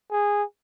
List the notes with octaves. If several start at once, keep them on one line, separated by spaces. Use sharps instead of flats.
G#4